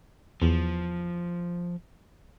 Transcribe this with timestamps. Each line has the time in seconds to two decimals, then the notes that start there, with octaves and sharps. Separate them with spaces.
0.42 E2 F3